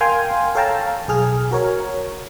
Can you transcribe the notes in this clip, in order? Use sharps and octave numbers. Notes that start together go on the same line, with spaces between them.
A#4 F5 G5 G#5 C6 F6
A4 C#5 F5 G5 A5 A#5
B1 G#4 F6
F#4 A#4 C#5